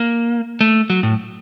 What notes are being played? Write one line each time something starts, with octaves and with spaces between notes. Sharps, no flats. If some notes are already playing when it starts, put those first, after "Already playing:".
Already playing: A#3
A3
F#3
A2